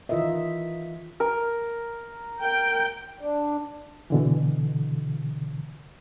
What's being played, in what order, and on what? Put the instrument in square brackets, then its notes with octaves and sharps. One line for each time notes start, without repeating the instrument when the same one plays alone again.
[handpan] D#3 E3 F4 A#4 D#5 E5
[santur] A#4
[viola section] A#4 G5
[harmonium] D4
[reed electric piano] B2 D3 E3